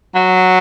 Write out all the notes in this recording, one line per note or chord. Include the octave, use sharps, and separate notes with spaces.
F#3